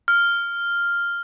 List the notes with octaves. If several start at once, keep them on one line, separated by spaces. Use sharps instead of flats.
F6